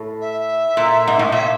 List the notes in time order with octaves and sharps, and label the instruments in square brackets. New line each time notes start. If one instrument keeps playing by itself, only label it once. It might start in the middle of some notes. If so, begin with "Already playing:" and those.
Already playing: [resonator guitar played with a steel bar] A2
[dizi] E5
[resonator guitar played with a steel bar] A#2
G#2
A2
[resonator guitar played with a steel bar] A#2 [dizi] E5